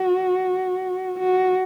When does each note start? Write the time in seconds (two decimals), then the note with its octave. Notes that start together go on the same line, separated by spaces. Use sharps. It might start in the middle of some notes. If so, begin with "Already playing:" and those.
Already playing: F#4
1.20 F#4